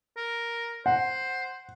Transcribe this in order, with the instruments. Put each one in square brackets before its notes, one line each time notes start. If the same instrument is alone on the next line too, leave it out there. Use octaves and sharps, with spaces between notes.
[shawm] A#4
[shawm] C5 [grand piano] F#5